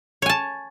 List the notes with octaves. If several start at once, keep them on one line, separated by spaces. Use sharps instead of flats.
C#5 G#5 A5